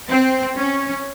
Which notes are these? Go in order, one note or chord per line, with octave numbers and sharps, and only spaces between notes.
C4
C#4